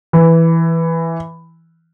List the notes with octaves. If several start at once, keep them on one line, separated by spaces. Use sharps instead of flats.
E3